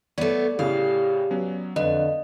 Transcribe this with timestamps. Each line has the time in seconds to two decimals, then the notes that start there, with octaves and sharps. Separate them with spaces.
0.18 A3 B3 C#5 D5
0.59 A2 C#3 G4 F5
1.31 F#3 B3 C#4
1.76 F2 D3 B4 D#5